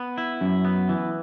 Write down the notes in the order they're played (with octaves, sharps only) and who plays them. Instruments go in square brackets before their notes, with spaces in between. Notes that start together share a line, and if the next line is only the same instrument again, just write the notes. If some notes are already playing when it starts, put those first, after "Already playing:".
Already playing: [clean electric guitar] B3
E4
F#2
B3
E3